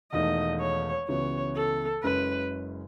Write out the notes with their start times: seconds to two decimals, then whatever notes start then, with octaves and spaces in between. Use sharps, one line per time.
0.12 E1 E2 D#3 A3 D#5
0.60 C#5
1.08 C#2 C#3 E3 B3 F#4 C#5
1.56 A4
2.03 F#1 F#2 C#3 G#3 C#4 B4